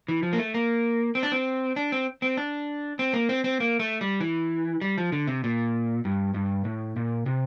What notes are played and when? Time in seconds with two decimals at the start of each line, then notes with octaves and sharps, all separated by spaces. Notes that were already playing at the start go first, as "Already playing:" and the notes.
0.08 E3
0.23 F3
0.33 A#3
0.38 A3
0.54 A#3
1.15 C4
1.23 D4
1.32 C4
1.76 D4
1.92 C4
2.22 C4
2.37 D4
2.99 C4
3.13 A#3
3.29 C4
3.44 C4
3.60 A#3
3.80 A3
4.01 G3
4.20 E3
4.81 G3
4.98 F3
5.12 D3
5.27 C3
5.44 A#2
6.05 G2
6.34 G2
6.65 A2
6.96 A#2
7.26 C3